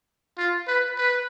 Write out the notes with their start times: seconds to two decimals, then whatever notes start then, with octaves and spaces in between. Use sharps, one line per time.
0.38 F4
0.67 B4
0.98 B4